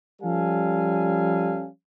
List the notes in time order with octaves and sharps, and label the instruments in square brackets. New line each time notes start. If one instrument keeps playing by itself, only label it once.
[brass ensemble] F3 G3 C#4 A4 F5 G#5